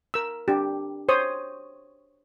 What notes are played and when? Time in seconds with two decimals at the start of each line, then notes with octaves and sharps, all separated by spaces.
0.14 A#4 E6
0.48 D4 G4
1.09 C5 C#5 D#6